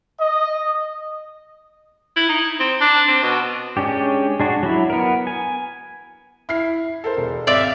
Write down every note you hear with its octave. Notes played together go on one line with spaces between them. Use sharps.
D#5
E4
D#4
C4
D4
C4
B2
G#3 C#4 D4 G4
G#3 D4 F#4
F#3 E4
B3 A#4
G#5
E4 F6 C7
A4 A#4 C5
E1
G#1 D5 E5 F5